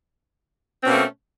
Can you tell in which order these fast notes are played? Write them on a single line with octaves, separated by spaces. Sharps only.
C4 C#4 B2 A#3 A3